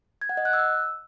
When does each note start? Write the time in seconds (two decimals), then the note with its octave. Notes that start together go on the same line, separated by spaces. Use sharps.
0.21 G#6
0.29 F#5
0.37 D#5
0.45 F#6
0.53 E6